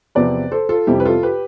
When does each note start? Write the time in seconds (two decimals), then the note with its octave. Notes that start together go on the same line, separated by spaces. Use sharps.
0.15 E2 C3 F3 B4 D5
0.52 A4 C5
0.69 F4 A4
0.87 F2 C3 G3 E4 G4
1.00 B4
1.05 F4 A4
1.23 G4 B4